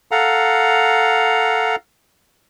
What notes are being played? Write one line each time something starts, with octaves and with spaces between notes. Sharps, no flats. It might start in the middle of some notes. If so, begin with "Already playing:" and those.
A4 F5 F#5 A#5